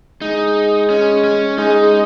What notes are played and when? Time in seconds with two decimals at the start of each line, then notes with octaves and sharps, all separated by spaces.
0.22 G#3 D#4
0.90 C#4
1.24 C#4
1.58 G#3 D#4